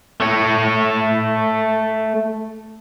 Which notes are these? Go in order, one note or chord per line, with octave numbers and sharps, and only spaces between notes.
A3 C#5